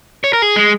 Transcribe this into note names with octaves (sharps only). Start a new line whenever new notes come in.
C#5
A#4
G#4
G#3